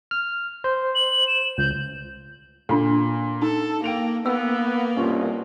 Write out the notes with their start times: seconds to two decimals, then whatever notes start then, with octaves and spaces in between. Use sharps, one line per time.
0.11 F6
0.64 C5
0.95 F#7
1.27 E7
1.58 C#2 G6
2.69 A#2 D4 F4 A4
3.42 D#4 A4
3.84 A#3 G5 D7 F7
4.26 A#3 B3 E6
4.96 C2 G2 B2 B3 C#4 F4